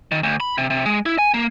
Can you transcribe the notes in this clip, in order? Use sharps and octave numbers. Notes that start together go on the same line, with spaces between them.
D#3
D2
B5
C3
C3
G#3
E4
G#5
A#3